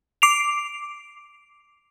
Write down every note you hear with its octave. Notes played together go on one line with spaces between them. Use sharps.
D6 C7 D7 F7